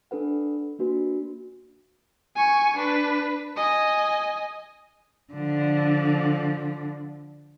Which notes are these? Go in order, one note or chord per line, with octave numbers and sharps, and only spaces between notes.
D4 A4 B4 F#5
A#3 D4 F#4 B4
G#5 C#6
D4 B4
D#5 G#5
D3 F3